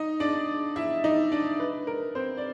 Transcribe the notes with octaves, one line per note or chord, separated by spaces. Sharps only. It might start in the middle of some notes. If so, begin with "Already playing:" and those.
Already playing: D#4 D#5
D4 D5
E4 E5
D#4 D#5
D4 D5
B4
A#4
C4 C5
D5